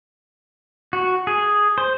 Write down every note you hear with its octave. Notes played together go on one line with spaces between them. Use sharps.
F#4
G#4
C5